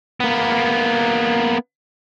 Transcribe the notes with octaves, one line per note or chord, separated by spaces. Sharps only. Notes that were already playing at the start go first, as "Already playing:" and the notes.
A#3 B3